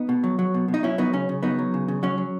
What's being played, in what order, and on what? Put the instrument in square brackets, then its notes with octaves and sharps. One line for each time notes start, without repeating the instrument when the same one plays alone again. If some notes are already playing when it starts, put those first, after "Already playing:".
Already playing: [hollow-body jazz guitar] B3 D#4
B2
F#3
F#3
B2
B2
D#4
F#3 C#4 E4
F#3 B3 D#4
C#3 C#4
C#3
F#3 B3 D#4
F#3
C#3
C#3
F#3 C#4
F#3